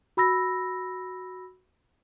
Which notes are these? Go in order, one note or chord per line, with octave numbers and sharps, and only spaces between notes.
F#4 B5 E6 A#6